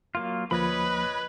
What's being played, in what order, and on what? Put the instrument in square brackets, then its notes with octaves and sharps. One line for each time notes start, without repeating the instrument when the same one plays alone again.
[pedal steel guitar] F#3 A#3 F4
[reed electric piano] D2 F3 A#3 [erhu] B4 [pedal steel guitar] C#5 D#5 B5